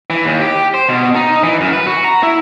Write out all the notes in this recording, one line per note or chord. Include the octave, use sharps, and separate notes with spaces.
E3
D#2
G4
C5
B2
D#4
E3
F#2
B4
F#4
A#5
E4